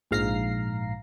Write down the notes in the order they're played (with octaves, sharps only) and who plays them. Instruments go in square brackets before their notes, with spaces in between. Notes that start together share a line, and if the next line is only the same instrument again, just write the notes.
[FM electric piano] A#1 G#2 F5 A#5 A#6 C7